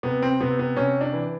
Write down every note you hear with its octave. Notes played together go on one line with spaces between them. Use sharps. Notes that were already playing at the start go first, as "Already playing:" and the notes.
C3 B3
C4
C3 B3
B3
C3 C#4
D4
E3